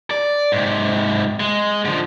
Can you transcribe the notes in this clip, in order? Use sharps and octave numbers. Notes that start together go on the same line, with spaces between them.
D5
G#2 C3
G#3
D3 F3